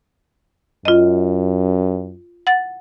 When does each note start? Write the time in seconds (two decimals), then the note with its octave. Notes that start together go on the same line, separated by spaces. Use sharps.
0.85 F#2 F4 D#5
2.47 F#5 A6